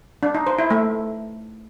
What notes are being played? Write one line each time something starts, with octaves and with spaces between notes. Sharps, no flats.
D4
D#4
C5
E4
A3